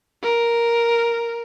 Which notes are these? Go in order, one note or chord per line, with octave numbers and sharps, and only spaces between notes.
A#4